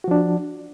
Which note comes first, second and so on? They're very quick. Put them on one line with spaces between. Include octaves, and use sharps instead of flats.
F#4 F3 D4